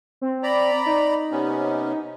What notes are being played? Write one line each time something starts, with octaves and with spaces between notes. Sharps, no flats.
C4
D5 A#5 B5
D#4
C3 B3 C#4